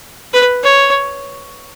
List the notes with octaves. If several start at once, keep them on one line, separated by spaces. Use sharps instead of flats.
B4
C#5